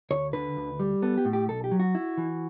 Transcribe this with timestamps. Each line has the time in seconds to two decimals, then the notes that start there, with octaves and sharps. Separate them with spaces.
0.11 D2 C#5
0.33 D3 B4
0.57 D2
0.80 G3
1.02 B3 A4
1.18 G4
1.25 A2
1.33 G4
1.48 B1 A4
1.64 G4
1.71 F#3
1.80 F#4
1.95 E4
2.18 E3